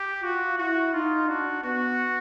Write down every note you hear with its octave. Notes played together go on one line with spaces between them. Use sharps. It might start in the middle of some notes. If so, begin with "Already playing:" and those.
Already playing: G4
F4 F#4
E4 F#4
D#4 F4
D4 F#4
B3 F#4